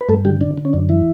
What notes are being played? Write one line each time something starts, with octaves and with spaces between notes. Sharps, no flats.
B4
G2 A3 A4
D3 G3 G4
D3 D4
D3
C#4
F#2 D4
E3 E4